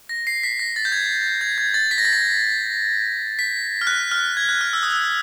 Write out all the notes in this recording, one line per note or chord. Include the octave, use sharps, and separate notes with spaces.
A#6
C7
B6
A#6
A6
G6
G#6
G#6
G#6
A6
B6
A#6
A6
A#6
B6
F6
F#6
F6
G#6
F#6
F6
E6
D#6
E6